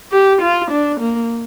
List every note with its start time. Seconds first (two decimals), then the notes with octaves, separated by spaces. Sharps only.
0.12 G4
0.41 F4
0.71 D4
1.00 A#3